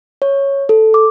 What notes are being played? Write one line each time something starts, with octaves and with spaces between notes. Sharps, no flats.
C#5
A4
D6